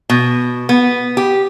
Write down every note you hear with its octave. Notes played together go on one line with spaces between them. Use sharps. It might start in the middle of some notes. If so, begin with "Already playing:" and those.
B2
B3
G4